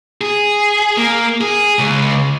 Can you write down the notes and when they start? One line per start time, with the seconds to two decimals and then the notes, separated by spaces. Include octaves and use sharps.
0.21 G#4
0.97 A#3
1.41 G#4
1.79 C#2